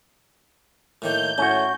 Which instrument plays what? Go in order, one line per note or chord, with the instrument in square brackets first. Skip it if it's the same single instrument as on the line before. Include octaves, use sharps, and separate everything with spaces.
[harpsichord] A2 D#3 A#3 [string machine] G6
[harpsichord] A2 [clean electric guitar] C#4 F#4